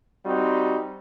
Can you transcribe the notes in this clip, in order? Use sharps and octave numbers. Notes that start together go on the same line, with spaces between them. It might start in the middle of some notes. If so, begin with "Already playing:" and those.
G3 C4 D#4 F#4